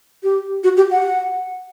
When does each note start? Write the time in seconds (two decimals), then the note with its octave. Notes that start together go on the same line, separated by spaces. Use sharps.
0.23 G4
0.64 F#4
0.77 G4
0.91 F#5